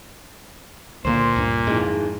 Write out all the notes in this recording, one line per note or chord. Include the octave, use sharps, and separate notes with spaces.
C#2 A#2 D3 A#3 C5
C#2 G2
F2 G#2 D#3 E3 G#3